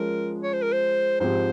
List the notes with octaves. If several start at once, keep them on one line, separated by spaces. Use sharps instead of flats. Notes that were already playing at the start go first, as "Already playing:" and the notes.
Already playing: F3 G#3 C#4 A#4
C#5
C5
A#4
C5
G#2 F3 C4 G4 C5